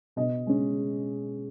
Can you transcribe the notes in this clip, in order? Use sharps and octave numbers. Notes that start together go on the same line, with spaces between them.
B2 D#5
G#3 C#4